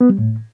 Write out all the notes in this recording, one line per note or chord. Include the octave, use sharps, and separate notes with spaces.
B3
G3
A2